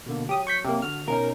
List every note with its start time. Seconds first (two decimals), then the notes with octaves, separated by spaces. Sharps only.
0.06 B2 D3 A#3
0.29 F#3 G4 D#6
0.47 C#6 G6 B6
0.65 C3 A#3
0.82 D3 F#4 F6
1.08 B2 C#4 D#4 A#4